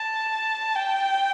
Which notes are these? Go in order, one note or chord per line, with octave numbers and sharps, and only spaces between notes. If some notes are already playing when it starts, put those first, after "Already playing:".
Already playing: A5
G5